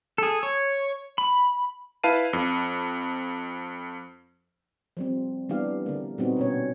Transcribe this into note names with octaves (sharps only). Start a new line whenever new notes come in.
G#4 A4
C#5
B5
E4 B4 F5 A5 D#7
F2
F3 G3 C4
E3 G3 B3 D4 G4 F5
D3 A#3
A#2 G3 B3 C4 D#4 F#4
B2 C#4 C#5